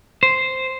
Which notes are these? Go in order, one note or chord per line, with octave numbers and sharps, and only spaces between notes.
C5